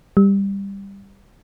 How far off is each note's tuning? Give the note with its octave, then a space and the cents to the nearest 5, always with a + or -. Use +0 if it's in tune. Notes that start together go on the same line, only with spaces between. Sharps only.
G3 +10